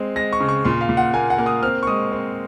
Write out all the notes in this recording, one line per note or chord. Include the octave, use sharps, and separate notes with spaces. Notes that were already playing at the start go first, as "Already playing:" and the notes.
Already playing: G#3 C4
G#3 A#6
C#6
C#3
C#6
A#2 C6
F5
A#2
F#5
A#3 G#5
F#5
A#3
D#6
C4 F6
C#6
G#3 D#6
C4